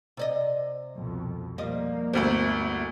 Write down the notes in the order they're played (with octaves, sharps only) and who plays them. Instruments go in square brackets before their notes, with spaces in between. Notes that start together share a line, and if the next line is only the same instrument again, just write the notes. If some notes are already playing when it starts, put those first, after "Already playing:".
[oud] C3 D5 D#5
[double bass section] C2 F2 B2
[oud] F3 G3 D#5 [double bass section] A#3
[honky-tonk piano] G1 D2 [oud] E4 C5